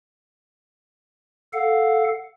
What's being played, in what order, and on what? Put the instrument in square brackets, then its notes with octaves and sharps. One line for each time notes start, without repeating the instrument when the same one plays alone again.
[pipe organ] A4 F5 F#5